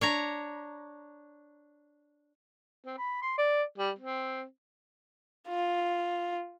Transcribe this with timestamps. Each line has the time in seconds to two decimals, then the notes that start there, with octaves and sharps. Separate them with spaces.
0.01 D4 C#5 A#5
2.86 C4
2.98 B5
3.22 C6
3.38 D5
3.78 G3
3.98 C4
5.48 F4